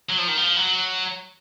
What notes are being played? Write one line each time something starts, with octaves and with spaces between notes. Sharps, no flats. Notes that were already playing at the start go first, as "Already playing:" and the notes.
F#3
F3
D#3
F3
F#3